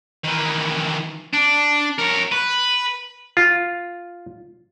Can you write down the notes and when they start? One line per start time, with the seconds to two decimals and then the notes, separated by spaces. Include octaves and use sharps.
0.24 D#3 E3
1.33 D4
1.99 A#4 C#5
2.32 B4
3.37 F4